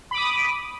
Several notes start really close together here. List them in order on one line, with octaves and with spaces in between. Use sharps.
B5 D6 D#6